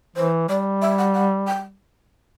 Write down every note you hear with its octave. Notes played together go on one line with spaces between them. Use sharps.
E3 C5
G3 D5
E5
F#5
F#5
G5